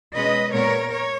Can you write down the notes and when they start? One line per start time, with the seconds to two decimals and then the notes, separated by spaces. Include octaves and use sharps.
0.15 B2 G#3 C#4 B4 D#5
0.53 A#2 G#3 B3 A#4 C#5
0.89 C#5